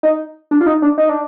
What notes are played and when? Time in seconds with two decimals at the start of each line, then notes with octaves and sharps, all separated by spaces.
0.03 D#4
0.51 D4
0.61 F4
0.66 D#4
0.82 D4
0.98 D#4
1.09 D4